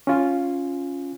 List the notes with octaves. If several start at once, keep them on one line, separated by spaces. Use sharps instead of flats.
C#4 F4